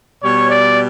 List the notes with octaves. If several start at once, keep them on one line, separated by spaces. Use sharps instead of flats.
B2 G3 C#5
D5